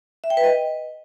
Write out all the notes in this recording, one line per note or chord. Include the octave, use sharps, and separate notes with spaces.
E5
G5
B4
D#5